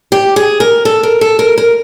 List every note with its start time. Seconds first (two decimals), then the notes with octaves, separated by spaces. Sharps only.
0.12 G4
0.36 G#4
0.60 A#4
0.85 A4
1.03 A#4
1.21 A4
1.39 A#4
1.58 A#4